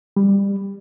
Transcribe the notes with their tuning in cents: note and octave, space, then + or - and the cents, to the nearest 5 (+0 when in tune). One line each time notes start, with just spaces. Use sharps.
G3 +20